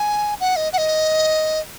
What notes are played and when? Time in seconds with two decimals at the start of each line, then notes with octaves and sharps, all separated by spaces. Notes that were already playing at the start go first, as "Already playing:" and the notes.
Already playing: G#5
0.40 F#5
0.56 D#5
0.73 F#5
0.78 D#5